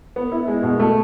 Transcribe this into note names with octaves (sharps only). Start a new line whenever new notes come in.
B3
E4
G#3
B2
A3